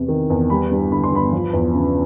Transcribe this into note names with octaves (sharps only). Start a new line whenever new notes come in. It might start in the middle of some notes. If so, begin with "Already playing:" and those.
Already playing: E2 C3
D#3
E2
G3 B5
G2
D3 B5
C6
G1 B5
F3
E2
C#3